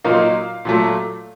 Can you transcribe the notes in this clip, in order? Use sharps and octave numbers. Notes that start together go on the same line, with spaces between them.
A#2 F#3 A#3 D#4 F5
A#2 F#3 A3